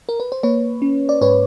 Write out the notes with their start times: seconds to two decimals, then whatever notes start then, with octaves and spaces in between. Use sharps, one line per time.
0.09 A#4
0.20 B4
0.32 C5
0.43 A#3 B4 C#5
0.82 C#4
1.09 D5
1.21 G#2 B4 C#5